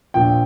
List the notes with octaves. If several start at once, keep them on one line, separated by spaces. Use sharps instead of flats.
A#1 A#2 F3 G5